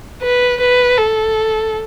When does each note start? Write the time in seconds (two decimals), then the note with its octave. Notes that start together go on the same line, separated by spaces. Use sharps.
0.22 B4
0.61 B4
0.97 A4